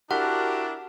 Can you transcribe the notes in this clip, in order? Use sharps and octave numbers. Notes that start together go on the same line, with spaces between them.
D4 E4 F#4 G4 A#4 F#5